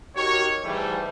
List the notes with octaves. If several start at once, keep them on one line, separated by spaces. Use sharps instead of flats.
D#4 F#4 G4 A#4 C#5
G#2 E3 G3 A3